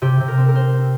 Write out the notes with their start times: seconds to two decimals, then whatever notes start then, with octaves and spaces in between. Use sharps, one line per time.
0.02 C3 G4
0.20 C3
0.28 A#4
0.37 C4
0.48 A#4
0.55 C4 C5
0.74 C4